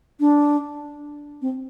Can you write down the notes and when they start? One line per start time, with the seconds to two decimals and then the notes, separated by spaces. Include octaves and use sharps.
0.20 D4
1.42 C4